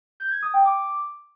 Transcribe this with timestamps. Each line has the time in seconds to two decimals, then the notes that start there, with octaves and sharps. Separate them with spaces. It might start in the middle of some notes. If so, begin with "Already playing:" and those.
0.20 G6
0.31 G#6
0.42 D#6
0.54 G5
0.65 D6